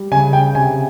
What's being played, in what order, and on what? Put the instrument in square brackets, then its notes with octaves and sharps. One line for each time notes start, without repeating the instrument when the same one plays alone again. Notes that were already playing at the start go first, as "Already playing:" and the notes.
Already playing: [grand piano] G3
C#3 G#5
G5
C3 G#5